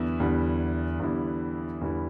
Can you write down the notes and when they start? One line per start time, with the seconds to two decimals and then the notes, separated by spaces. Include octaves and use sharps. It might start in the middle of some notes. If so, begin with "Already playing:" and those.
Already playing: E2 D3 G3 B3 E4
0.20 E2 D3 G3 B3 E4
1.00 E2 D3 G3 B3 E4
1.81 E2 D3 G3 B3 E4